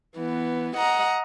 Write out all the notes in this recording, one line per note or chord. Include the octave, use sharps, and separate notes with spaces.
E3 B3
D#5 F#5 A#5